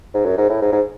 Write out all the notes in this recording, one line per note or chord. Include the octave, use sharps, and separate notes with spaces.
G#2
F#2
G#2
A2
G#2
G#2